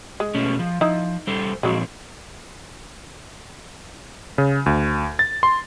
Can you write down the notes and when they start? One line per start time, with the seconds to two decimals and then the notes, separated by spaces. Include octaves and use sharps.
0.20 G#3
0.35 B2 A3 C#4
0.59 F3
0.81 F3 D#4 E4
1.27 G3 A4 C5
1.63 A#2 F3 F#3 G#3 C4
4.38 C#3
4.66 D2
5.19 A6
5.43 C6